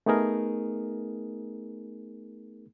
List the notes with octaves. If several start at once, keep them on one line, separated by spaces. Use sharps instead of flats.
A3 B3 D#4 G#4 A#4